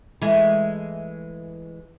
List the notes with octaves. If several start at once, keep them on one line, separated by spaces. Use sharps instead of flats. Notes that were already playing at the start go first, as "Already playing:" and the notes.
E3 G#3 A3